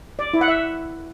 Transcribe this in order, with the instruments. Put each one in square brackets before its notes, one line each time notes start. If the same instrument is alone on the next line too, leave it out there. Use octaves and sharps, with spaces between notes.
[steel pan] D5
E4
F#5
E5